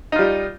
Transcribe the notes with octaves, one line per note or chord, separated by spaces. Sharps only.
G3 D#4 F4